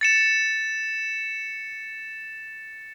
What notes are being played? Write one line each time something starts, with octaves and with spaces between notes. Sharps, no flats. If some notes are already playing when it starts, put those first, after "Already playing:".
A6 C#7 E7